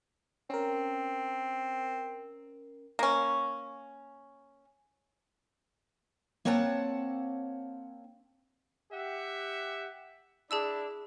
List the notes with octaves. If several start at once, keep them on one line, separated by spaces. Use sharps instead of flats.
C4 C#4 A#4
A#3 C#4
A#3 C4 C#5 F#5 A5
G4 E5 F#5
D4 E4 G#4 D5 A5 E6